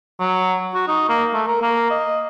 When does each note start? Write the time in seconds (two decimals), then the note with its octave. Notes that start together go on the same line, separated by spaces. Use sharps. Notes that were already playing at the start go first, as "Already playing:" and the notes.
0.20 F#3
0.75 F#4
0.88 D#4
1.09 A#3
1.34 A3
1.48 A#4
1.62 A#3
1.90 D#5